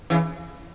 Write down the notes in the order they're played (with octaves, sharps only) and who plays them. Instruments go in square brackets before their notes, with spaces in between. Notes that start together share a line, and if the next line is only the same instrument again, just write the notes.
[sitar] C#3 E3